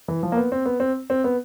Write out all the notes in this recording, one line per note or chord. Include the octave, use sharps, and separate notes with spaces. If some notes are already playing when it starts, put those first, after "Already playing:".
E3
F3
A#3
B3
C4
B3
C4
C4
B3